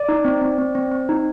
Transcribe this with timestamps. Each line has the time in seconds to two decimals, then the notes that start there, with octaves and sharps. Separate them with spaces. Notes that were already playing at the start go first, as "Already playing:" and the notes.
Already playing: D5
0.09 D#4
0.25 C4
0.41 C4
0.58 C4
0.75 C4
0.91 C4
1.09 D#4